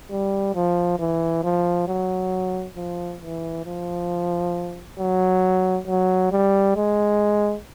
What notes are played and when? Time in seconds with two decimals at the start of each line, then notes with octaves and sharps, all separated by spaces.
0.10 G3
0.55 F3
0.99 E3
1.43 F3
1.88 F#3
2.77 F3
3.22 E3
3.65 F3
4.99 F#3
5.87 F#3
6.32 G3
6.76 G#3